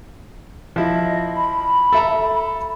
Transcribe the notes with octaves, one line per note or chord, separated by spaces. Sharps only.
F3 E4 D#5
B5
A4 E5 A#5